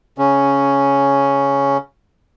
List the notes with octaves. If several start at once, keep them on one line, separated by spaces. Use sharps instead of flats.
C#3 C#4